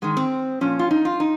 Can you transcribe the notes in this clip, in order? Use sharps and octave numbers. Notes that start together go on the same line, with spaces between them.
G#2 D#3 G#3
C4
A#2 F3 C#4
F4
D#4
F4
D#4